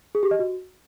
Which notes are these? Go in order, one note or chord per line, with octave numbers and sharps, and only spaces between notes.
G#4
G4
D#5
F#4